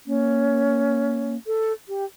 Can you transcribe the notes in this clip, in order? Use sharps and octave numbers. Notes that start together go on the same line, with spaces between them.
A#3 C#4
A4
G4